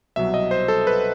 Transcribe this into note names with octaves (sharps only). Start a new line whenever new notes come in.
C2 B2 F#3 E5
D#5
C5
A4
B4